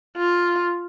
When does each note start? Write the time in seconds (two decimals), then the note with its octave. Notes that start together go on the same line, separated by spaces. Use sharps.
0.17 F4